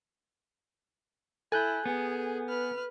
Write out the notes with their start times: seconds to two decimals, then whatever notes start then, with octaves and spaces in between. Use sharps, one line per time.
1.52 E4 A4 G#5 F#6 G6
1.85 B3 G#4
2.49 B4 F6